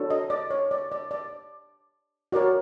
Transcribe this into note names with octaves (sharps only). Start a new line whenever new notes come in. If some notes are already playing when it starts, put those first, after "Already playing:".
Already playing: D4 F#4 A4 C#5
D#5
D5
C#5
D5
D5
D5
F#4 A#4 C#5 D5